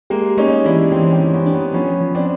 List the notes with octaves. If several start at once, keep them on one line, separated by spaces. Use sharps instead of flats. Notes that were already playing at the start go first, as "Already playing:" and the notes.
G#3 A#3 G4
A3 C#4 D#4
E3 D4 E4
E3 C4 D4
C4 D4
E3
B3 C#4
D4
B3 C#4
F3 B3 C#4
F3
C4 D4